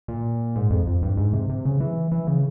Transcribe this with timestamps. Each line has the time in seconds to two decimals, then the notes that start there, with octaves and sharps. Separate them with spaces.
0.08 A#2
0.55 G#2
0.70 F2
0.87 F2
1.03 G2
1.17 G#2
1.33 C3
1.49 C3
1.65 C#3
1.80 E3
2.12 E3
2.27 C#3